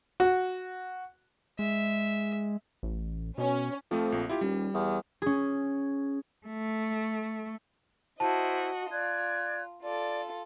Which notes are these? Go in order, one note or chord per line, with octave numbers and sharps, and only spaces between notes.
F#4
G#3 E5
A1
B2 C#4
F2 F3 A3
A#1
E4 F4 G4
D#1 G3
E2
C#4 G#4
A3
E4 F#4 C5 D#5 A5
F4 D5 F#6 G#6
F4 A4 D5